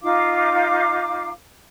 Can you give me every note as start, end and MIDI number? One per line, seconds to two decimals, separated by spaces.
0.02 1.29 63
0.02 1.29 65
0.02 1.29 77
0.02 1.29 86